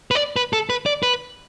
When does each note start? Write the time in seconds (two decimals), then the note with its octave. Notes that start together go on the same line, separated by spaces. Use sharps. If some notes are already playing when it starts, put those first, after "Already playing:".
0.11 B4
0.15 D5
0.36 B4
0.53 A4
0.70 B4
0.86 D5
1.03 B4